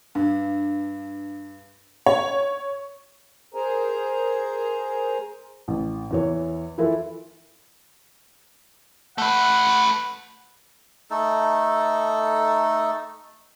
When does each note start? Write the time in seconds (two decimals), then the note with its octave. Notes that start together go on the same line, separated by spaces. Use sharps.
0.15 G2
2.06 C#5
3.54 G#4 A#4 C5 G#5 A#5
5.68 A1
6.11 E2 E3 C#5
6.78 E3 E4 F4 A4 B4
9.18 A3 B4 F#5
11.10 A3 D#4 A4